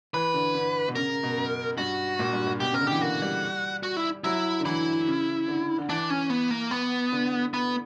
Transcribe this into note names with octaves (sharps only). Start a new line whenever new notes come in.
E3 B4
D3
D3
B2
C#3 A#4
C#3
B2
F#2
G2 F#4
A#2
G2
A#2
B2 G4
C#3 A#4
D3
E3 G4
A#3 F#4
G3
F#4
E4
F#3 E4
D3
E3 E4
C#3
D3
D3
E3 D4
C#4
B3
A#3
B3
D3
B3